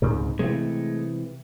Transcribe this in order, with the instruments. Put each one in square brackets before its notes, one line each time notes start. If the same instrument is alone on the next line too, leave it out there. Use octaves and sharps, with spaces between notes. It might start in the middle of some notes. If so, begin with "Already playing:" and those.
[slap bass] C#2 G#2 C3
[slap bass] C3 E3 [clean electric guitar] G#3 A3